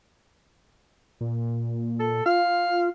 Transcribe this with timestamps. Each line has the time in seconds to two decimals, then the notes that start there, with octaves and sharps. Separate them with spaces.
1.21 A#2
2.00 A4
2.26 F4 F5